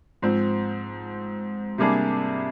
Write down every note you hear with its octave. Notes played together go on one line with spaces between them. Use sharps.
G#2 F3 C4
C3 G3 A#3 D4 G#4